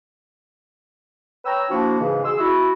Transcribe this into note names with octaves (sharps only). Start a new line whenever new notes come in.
B4 C#5 G5 A#5 E6
F3 A#3 D4 E4 F#4
G#2 C#3 E3
B2 G#4 C6 E6
E4 F#4